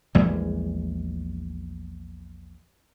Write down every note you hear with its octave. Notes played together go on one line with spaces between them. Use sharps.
A#1 E2 G3 G#3